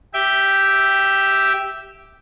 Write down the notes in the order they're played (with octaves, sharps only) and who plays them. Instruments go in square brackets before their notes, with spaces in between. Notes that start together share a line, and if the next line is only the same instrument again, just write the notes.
[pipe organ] G4 E5 G5